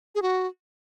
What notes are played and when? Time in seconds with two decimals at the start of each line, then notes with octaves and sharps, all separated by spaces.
0.15 G#4
0.22 F#4